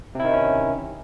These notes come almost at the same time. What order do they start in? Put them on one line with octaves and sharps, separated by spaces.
C3 E4 D#3 D#4 C#4